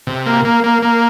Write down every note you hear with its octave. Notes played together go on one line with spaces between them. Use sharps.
C3
A#3
A#3
A#3
A#3